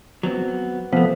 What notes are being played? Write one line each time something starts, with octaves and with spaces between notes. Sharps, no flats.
F#3 B3 C4
C3 F3 A3 B3